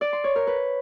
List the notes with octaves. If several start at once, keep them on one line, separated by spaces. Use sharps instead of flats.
D5
C6
C#5
A#4
B4